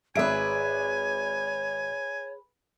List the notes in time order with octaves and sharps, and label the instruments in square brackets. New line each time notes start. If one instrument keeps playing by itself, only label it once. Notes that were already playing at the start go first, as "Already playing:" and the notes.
[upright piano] G#1 E5 D7 [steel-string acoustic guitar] G#4 B4 [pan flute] C#5 [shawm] G#5